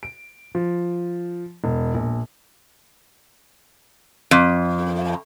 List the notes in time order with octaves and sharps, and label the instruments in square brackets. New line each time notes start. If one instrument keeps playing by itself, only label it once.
[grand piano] D7
F3
E1
A#1
[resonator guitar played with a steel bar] F2